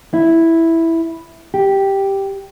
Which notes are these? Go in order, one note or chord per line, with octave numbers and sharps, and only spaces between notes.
E4
G4